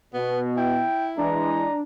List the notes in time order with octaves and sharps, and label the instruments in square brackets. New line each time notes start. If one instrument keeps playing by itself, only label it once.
[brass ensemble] B2 [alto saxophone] B3
[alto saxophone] E4 [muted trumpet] G5
[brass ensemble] E3 G#3 [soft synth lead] D4 [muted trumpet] A#5